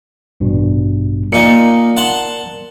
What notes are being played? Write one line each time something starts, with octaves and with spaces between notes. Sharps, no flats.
A1 G2 B2
A#2 D#4 A#4 D5 C#7
F#5 A5 C6